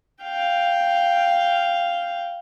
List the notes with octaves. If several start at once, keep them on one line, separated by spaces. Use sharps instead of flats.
F5 G5